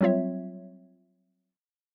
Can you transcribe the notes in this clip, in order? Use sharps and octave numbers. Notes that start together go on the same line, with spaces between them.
F#3 G3 C4 F4 C#5 E5